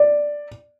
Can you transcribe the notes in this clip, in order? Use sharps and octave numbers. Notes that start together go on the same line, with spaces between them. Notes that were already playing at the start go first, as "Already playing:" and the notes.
Already playing: D5